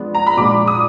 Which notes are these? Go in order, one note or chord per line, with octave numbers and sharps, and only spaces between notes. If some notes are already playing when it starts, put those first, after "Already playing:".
Already playing: F3 G#3 B3 D4
A#5
B5
A#2 F3 G#3 D4 D6
D#6